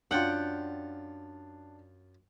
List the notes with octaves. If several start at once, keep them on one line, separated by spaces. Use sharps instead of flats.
F#2 D4 F4 F#5 G5